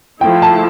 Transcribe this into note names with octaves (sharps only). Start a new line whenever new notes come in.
F3 A3 E4 G5
A5